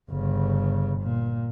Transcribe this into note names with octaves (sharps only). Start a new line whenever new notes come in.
G1 C#3
A#2